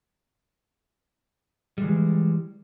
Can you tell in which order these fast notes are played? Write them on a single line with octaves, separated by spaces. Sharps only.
G3 G#3 E3